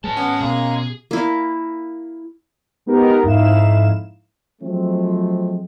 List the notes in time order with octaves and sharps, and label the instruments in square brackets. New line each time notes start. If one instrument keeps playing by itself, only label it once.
[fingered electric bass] G#3 [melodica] C#4 [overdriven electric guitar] B4 A5
[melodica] B3 F#5 [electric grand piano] C#4
[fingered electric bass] B2 [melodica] G#3 A#3 A#5 [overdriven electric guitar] G#4
[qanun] A#3 E4
[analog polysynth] G#3 B3 D#4 G4 A#4
F2 G#2 D#4 E4 F5 E7
[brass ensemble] F3 F#3 G#3 A3 C4